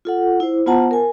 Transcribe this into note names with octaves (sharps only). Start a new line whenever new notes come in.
F4 A4 F#5
E4 C5
B3 F4 C5 F#5 A5 A#5
A#4 G#5